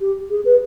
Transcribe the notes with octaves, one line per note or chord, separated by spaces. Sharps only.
G4
G#4
B4